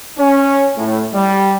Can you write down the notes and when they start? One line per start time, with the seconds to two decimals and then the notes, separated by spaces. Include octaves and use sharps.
0.19 C#4
0.77 A2
1.14 G3